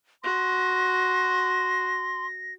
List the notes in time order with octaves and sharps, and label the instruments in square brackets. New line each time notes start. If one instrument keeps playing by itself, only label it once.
[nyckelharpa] F#4 [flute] C6 [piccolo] A#6